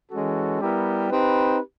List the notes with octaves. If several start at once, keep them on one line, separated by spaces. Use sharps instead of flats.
E3 G#3 C#4 F#4 A4
G3 B3 E4 G4 A#4
C4 D#4 G4 B4